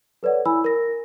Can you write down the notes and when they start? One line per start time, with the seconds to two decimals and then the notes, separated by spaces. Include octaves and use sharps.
0.23 A4 B4 C#5 D5 F#5
0.46 E4 G#5 B5 E6
0.64 A#4 A#6